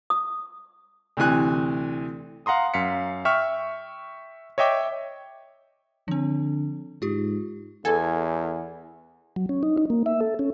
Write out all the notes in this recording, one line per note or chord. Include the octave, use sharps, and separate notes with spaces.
D#6
D2 C3 E3 G#5 F#6
F5 F#5 A#5 C6 D#6
F#2 F5 B6 C#7
E5 G5 C#6 F6
C#5 D#5 E5 G5 D6
D3 F3 C4
G#2 F4 G4
E2 A4 G#5
F#3
C#4
D#4
D#4
A#3
E5
A4
C#4